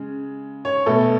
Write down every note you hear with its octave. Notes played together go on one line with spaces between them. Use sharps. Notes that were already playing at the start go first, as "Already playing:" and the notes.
Already playing: C#3 G#3
C#5
B2 A3 A4